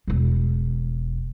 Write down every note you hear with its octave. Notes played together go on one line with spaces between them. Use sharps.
E1 D4